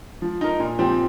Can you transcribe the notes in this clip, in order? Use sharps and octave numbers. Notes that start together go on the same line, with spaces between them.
F3
D#4 A#4
A#2
F3 C4 G4